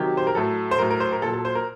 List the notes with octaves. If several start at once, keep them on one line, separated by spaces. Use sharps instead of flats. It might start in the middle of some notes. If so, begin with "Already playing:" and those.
Already playing: C3 D#3 F#3 G4
C5
A#4
A2 F#3 A4
C5
A2 F#3 A#4
A#4
C5
A#4
A#2 F#3 A4
A4
C5
A#4